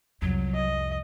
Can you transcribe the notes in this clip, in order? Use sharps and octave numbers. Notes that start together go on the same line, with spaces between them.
C2 F2 F#3
D#5